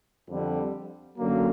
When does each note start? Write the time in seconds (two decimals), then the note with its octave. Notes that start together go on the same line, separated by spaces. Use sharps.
0.28 F2 D3 G3
1.18 F#2 D3 F#3 A#3